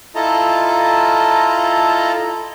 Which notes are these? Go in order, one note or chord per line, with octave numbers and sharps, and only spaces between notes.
E4 F4 A4 D#5 A5 A#5